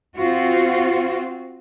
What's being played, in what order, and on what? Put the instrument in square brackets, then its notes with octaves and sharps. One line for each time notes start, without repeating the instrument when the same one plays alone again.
[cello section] C4 F4 F#4